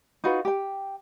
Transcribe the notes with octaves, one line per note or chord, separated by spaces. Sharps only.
D#4 F4 F#4 B4
G4 G5